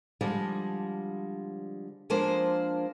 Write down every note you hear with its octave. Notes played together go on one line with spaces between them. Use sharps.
D3 F3 G3 G#3
F3 G#3 A#3 D4 C5